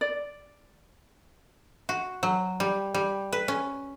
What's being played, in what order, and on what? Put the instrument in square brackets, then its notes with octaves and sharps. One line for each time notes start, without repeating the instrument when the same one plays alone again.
[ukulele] D5
[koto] F#4
F#3
G3
G3
B4
C#4